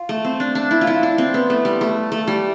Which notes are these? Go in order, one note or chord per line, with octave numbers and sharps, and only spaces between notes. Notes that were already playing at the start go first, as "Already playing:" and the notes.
Already playing: F4
A3
C4
D4
D4
E4
F4
E4
D4
C4
B3
A3
G3
A3
A3
G3